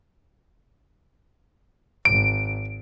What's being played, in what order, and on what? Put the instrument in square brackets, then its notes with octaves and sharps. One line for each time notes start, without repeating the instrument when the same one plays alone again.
[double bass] G#1 [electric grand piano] D7